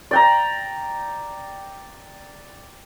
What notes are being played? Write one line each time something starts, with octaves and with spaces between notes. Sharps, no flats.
D5 G5 A#5